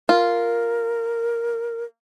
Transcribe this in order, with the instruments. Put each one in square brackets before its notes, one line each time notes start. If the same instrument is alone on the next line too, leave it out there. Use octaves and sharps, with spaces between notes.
[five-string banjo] F4 [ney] A#4